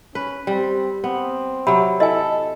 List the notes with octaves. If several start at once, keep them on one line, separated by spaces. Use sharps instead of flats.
C#4 B4
G3 C4
B3 C4
C3 F#3 B5
E4 A4 D#5 G#5